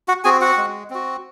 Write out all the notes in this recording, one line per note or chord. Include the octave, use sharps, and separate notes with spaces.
F#4 F#5
C4 F#4 G#4 G#5
F#4 F#5
G#3
C4 F#4